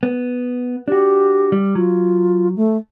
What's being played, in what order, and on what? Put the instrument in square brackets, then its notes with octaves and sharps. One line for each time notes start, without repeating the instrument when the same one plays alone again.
[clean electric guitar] B3
[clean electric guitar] D4 F#4 [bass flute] G4
[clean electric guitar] G3
[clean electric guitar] F#3 [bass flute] F4
[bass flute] A3